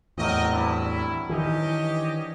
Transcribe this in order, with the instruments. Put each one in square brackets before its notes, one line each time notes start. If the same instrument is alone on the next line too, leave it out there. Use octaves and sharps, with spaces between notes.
[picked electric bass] E2 A2 [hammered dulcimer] C3 F#3 [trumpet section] G4 A#4 D#5
[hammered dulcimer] G2 D4 [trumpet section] E4
[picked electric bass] D#3 E3 [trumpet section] C#4 G4 D#5